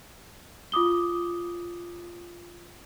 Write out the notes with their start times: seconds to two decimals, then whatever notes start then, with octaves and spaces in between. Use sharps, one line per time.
0.72 F4 D6 D#6 G7